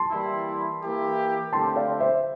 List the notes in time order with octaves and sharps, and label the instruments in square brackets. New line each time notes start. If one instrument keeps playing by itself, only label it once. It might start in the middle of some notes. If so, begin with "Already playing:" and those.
Already playing: [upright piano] A5 C6
[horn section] E3 G3 A#3 E4
E3 A#3 E4 G4
[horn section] D3 A3 C4 E4 G4 [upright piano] A5 C6
[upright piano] D5 F5
C5 E5